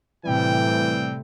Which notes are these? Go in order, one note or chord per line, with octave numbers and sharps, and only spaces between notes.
A2 C3 E3 G3 A3 C4 G5